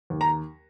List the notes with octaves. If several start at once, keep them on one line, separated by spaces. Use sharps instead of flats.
D#2
A#5